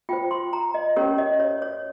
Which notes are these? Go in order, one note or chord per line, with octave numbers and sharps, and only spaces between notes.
F4 C5 G5
C6
A#5
D#5
C#4 G4 A#4 C#5
D#5
C#5
C#5